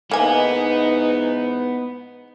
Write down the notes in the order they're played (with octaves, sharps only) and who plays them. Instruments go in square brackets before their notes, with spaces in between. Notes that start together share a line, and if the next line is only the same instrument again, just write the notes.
[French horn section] G#2 E3 D#4 [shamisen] A#3 G#5 [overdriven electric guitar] B3 [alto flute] B4